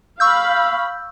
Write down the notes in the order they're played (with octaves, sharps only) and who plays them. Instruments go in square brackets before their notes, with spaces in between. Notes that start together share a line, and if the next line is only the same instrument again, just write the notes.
[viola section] F5 B5 [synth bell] C#6 E6 G6